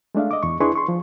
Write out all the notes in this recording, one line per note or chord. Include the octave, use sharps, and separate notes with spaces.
G#3 A3 D4 E5 F5
D#5 D6
E2 C#6
D4 E4 G#4 B4 C6 C#6
C6 C#6
F3